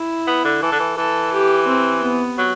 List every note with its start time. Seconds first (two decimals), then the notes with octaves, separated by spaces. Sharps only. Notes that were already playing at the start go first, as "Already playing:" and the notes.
Already playing: E4
0.27 B3
0.45 D3
0.63 E3 A4
0.72 D3
0.80 E3
0.97 E3 A4
1.33 G4
1.68 C4
2.03 B3
2.38 F#3